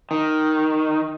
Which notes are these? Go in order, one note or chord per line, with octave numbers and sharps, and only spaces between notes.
D#3